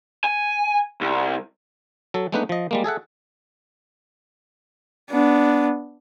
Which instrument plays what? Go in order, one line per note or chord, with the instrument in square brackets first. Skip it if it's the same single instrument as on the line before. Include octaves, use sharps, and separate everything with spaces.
[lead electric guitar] G#5
C2
[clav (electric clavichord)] F#3 A4
G#3 A3 B3 D4 D#4 B4
F3 D#5
G3 G#3 A#3
G#4 A4 E5 F#5
[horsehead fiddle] B3 D4